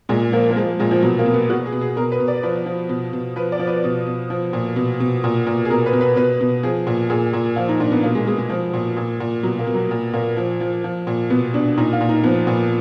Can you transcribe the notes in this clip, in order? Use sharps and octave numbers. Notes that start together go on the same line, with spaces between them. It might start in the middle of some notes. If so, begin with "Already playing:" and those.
A#2 G#3
F3 A#3
A#3
F3 G#3
A#2 G#3
F3
B2 F#3
A#3
B2
B3
B2 F#4
G#4
B2
G#4
B2 A#4
B4
B2
D5
F3 B4
F3
B2
B2
F3 B4
D5
F3
B4
B2
B2
F3
A#2
B2
B2
A#2
A#2
G#4
B2 A#4
B4
B2
B4
B2 B4
B2
F3 G#4
A#2
A#2 G#4
A#2
F3 F4
D#4
A#2 D4
B3
B2 A#3
G#3
B2 G#3
G#3
F3
A#2
A#2
A#2
B2 F#3
A#3
B2
F#3
A#2
A#2 A#3
F3
F3
F3
A#2
B2 B3
B2 D4
A#2 D#4
F4
A#2
D#4
F3 B3
A#2